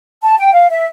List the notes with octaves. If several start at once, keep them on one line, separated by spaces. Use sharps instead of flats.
A5
G5
F5
E5